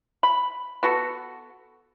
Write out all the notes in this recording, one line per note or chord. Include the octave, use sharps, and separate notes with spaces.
B5
B3 F#4 A4